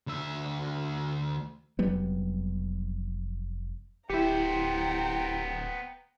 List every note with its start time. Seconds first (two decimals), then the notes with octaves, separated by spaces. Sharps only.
0.07 D2 E5
1.79 F1 F#3 G3 B3
4.10 D1 B3 E4 G4 C5 G5 A#5